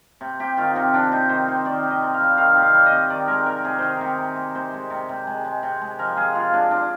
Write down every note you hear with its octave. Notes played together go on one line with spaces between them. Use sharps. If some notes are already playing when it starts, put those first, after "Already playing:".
C3
C3 G4
D#3 F4
C3 C4
C3 D4
C3 D#4
D#3 C5
C3 C5
D#3 D5
C3
D#5
C3
F5
G3
D#3 F5
C3
F5
G3
D#5
C3
D#3 D5
G#3 A#4
C3 A#4
C3 G#4
D#3 A#4 C5
C3
C3
C3
C3 C5
G#3
C3
C3
G#3
G#3
C3
G#3
F3 A#4
G#3 G#4
F3 F4
G#3 D4
D4